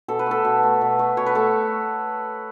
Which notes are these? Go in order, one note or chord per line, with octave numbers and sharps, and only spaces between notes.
B2 A4
B4
A3 A4
B2
A3
B2
A3
B2 C#5
B4
A3 A4